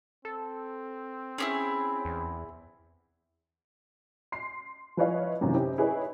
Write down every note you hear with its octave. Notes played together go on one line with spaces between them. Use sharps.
C4 A4
C#4 E4 G4 G#4
E2
C6 C7
F3 E4 B4 C#5 D#5 F5
F#2 A2 C3 D#3 E3
C4 C#4 D#4 E4 G4
E4 G#4 B4 C#5 D#5